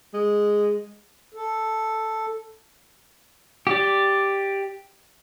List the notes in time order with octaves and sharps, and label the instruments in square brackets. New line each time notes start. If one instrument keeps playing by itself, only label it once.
[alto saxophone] G#3
[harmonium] A4
[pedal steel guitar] G4 D5